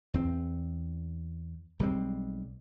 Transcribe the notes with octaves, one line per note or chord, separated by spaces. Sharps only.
E2 C4
B1 G3 G#3 C4